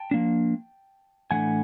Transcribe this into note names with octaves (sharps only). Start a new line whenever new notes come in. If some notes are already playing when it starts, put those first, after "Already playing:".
Already playing: G5 A5
F3 A#3 D4
A2 E3 A3 D4 F#5 G#5